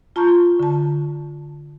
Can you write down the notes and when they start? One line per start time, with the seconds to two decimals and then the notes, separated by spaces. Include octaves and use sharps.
0.16 F4 A5 A#5 C#6 F6 G6
0.59 D3 A5